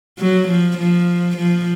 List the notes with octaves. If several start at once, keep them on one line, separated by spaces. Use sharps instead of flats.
F#3
F3
F3
F3